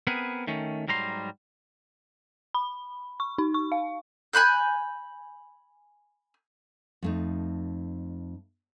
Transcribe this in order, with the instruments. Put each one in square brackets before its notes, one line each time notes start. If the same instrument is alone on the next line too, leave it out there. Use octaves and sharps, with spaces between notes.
[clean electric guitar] B3 C4 G#4 A#4 B4
D#3 A3 C#4
G#2 F#3 G3 A#5 C6
[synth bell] B5
C#6
D#4
C#6
F5
[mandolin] G#5 B5 F#6 G6
[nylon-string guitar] F2 A3 D#4